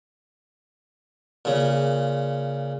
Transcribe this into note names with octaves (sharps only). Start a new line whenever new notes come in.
A#2 C#3